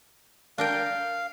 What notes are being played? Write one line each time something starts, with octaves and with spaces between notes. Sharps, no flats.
D4 A#4 F5 G5